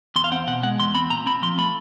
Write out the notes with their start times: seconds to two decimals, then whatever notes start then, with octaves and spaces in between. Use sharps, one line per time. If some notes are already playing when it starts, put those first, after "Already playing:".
0.16 E2 C6
0.24 F5
0.32 C4 F#5
0.47 B2 F#5
0.63 G#3 F#5
0.80 E2 C6
0.95 C4 B5
1.10 A#2 A#5
1.26 C4 B5
1.42 F3 C6
1.58 A3 B5